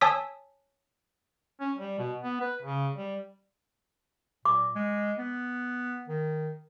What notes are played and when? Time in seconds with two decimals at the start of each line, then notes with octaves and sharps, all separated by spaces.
0.01 C#5 G#5 A5 D#6 E6 B6
1.61 C#4
1.76 G3
1.99 B2
2.22 B3
2.41 B4
2.62 C#3
2.95 G3
4.45 A#2 D6
4.75 G#3
5.18 B3
6.08 D#3